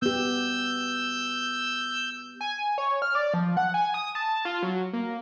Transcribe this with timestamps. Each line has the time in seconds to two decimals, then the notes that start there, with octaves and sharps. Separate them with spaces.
0.02 B3 G4 E6 G6
2.41 G#5
2.78 C#5
3.02 F6
3.15 D5
3.34 F3
3.57 F#5
3.74 G#5
3.94 D#6
4.15 A5
4.45 F4
4.63 F#3
4.93 A#3